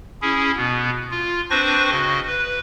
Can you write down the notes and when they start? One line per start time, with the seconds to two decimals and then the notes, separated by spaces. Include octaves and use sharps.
0.22 C#4 E4 G#4
0.57 B2 B3
1.11 F4
1.50 C4 D4 B4 C5 C#6 A#6
1.90 C#3 F#4 D#5
2.27 B4